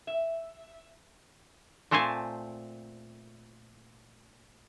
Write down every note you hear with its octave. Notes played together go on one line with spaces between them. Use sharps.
E5
A#2 A3 C4 C5 G#5 A5